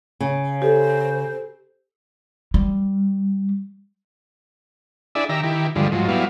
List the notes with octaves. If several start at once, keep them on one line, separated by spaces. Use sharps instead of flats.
C#3
G4 A4 C5
G3
D4 E4 G#4 D5 E5
D#3 G4 E5 A#5
D#3 E4 G4
G2 D3 F3 G3 G#3
G#2 F3 F#3
F#3 G3 B3 E4 F5